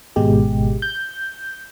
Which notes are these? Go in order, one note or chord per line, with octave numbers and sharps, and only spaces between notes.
G#1 B2 G#3 G4
G6